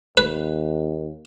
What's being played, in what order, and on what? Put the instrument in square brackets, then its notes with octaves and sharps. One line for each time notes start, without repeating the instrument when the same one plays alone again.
[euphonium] D#2 [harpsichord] B4